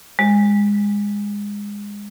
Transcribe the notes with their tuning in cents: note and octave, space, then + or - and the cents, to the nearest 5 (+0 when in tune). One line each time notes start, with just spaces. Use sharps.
G#3 -20